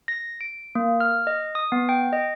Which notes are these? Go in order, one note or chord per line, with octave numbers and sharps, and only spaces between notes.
A#6
D7
A#3
F6
D#5
D#6
B3
G5
D#5